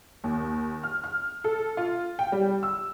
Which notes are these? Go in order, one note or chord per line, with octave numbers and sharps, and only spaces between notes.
D#2
F6
F6
A4
F4
G5
G3
E6